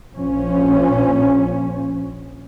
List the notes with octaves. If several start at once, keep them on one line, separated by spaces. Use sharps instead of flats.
A#1 F3 C#4